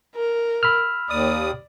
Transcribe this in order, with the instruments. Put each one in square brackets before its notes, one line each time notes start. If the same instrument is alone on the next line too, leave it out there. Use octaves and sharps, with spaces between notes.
[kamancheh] A#4
[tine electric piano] B5 E6 F6
[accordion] D#2 D#6 [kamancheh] D5